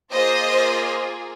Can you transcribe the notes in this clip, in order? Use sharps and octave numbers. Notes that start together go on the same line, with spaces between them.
A#3 F4 G#4 C5 D#5